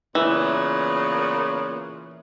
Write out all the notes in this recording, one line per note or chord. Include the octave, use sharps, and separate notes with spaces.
A#2 C#3 E3 B3